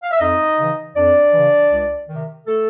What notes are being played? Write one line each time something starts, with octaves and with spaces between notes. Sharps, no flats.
F5
E5
F2 D#4 D#5
C#3 E3
F2 D4 D5
C#3 E3
C#2
C3 D#3
A3 A4